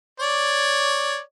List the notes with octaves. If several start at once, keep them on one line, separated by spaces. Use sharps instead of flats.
C#5 D5